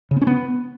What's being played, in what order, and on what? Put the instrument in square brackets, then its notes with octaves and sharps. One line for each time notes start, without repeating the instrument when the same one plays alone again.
[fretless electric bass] C#3
B3
C#4
B3